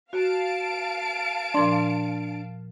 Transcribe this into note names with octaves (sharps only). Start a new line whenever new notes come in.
F#4 F5 A5 D7
A#2 F3 D4 C6